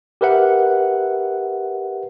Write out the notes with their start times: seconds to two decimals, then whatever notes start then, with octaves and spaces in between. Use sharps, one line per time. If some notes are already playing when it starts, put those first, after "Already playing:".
0.21 G4 A#4 B4 E5 F#5